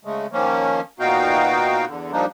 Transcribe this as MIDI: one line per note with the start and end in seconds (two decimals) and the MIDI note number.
0.05 0.26 49
0.05 0.26 56
0.05 0.26 57
0.32 0.81 51
0.32 0.81 53
0.32 0.81 58
0.32 0.81 61
1.00 1.85 46
1.00 1.85 59
1.00 1.85 63
1.00 1.85 66
1.00 1.85 77
1.00 1.85 79
1.86 2.12 40
1.86 2.12 50
2.12 2.26 53
2.12 2.26 55
2.12 2.26 58
2.12 2.26 62
2.12 2.26 63